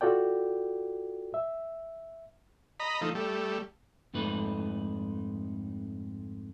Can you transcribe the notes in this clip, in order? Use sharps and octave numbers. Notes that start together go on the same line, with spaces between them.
F4 F#4 A4 D5 G5
E5
D#5 A#5 B5
F3 A3 D#4
G3 A3
F2 G#2 A3 D#4 B4